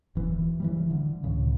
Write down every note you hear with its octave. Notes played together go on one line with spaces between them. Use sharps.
E1 E3
E3 F3 G3
D3
C#2 A2 C#3